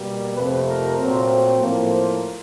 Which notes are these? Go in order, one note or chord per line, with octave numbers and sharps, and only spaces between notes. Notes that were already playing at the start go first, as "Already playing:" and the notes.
Already playing: B2 G3 A#3
F2 C3 F3 A3 B4
A#4
A#2 F#3 A3 C4
A2 F3 A#3
C5